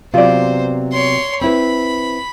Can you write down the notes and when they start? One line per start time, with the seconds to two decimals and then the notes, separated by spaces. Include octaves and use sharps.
0.14 C3 F#3 B3 F4 C5 D5
0.92 C#5 C6
1.41 C4 E4 B4 B5